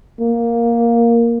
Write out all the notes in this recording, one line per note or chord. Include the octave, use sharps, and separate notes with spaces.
A#3